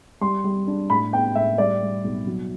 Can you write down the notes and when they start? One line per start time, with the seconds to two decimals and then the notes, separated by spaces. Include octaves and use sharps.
0.21 G3 C6
0.44 G3
0.67 D4
0.90 A2 B5
1.13 B3 G5
1.35 A2 E5
1.58 G3 D5
1.81 G3
2.04 B1
2.27 F#3